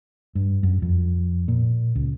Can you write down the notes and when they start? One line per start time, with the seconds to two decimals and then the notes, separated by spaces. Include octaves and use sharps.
0.35 G2
0.63 F#2
0.82 F2
1.48 A#2
1.95 C#2